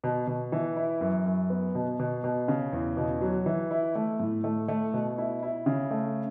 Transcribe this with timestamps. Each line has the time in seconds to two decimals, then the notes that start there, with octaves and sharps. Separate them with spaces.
0.04 B2
0.27 B2
0.52 E3
0.77 E4
1.01 F#2
1.26 F#2
1.50 B3
1.75 B2
1.99 B2
2.24 B2
2.48 C#3
2.73 E2
2.97 B2
3.21 F#3
3.46 E3
3.71 E4
3.95 A3
4.20 A2
4.44 A3
4.68 A3
4.94 B2
5.18 E4
5.43 E4
5.66 C#3
5.91 A3